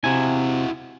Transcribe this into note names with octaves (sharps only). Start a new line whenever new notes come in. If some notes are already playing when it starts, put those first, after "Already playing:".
C3 E4 F#4 G#5